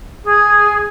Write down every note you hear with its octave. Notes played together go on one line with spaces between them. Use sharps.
G#4